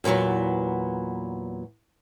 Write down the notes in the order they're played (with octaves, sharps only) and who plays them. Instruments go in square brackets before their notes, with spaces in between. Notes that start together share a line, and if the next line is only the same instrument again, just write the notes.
[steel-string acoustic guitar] E2 A#2 E3 F#3 B3